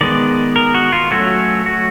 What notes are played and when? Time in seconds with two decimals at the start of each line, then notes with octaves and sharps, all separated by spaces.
0.01 D#3 G#3 B3 D5
0.56 A#4
0.74 F#4
0.92 F4
1.11 F#3 A3 C#4 F#4
1.66 F#4